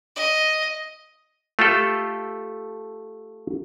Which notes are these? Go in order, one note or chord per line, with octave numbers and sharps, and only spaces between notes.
D#5
A3 F4 G4 A4